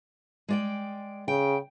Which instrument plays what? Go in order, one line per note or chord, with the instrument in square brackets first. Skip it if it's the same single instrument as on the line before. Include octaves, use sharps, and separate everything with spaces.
[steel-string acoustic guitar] G#3 D5 G5
[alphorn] C#3 [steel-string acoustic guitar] G5